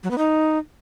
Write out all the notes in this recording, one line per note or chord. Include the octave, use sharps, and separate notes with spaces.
F#3
B3
D#4